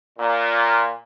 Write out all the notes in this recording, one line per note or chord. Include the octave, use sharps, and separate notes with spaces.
A#2